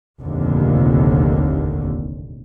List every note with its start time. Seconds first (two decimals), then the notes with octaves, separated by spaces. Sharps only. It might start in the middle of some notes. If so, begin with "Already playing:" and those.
0.20 F1 A#1 D#2 A#2 D3